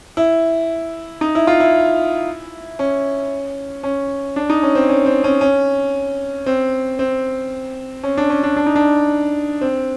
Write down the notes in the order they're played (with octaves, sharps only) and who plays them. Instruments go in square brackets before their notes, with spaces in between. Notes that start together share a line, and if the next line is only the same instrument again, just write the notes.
[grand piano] E4
D#4
E4
F4
E4
C#4
C#4
D4
D#4
C#4
C4
C#4
C4
C#4
C#4
C4
C4
C#4
D4
C#4
D4
D4
D#4
D4
C4